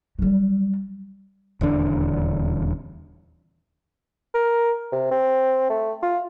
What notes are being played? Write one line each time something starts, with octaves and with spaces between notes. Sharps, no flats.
F#3 G3
D#1 E2 D3 D4
A#4
C3
C4
A3
F4